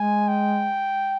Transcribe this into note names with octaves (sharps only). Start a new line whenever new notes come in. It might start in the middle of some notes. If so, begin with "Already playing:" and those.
Already playing: G#3 G#5
G5